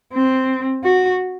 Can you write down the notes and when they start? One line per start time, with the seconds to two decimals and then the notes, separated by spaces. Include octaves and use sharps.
0.13 C4
0.84 F#4